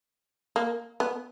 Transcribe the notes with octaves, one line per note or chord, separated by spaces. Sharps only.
A#3
B3